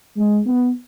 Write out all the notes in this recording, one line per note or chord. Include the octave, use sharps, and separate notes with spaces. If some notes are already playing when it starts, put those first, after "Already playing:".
G#3
B3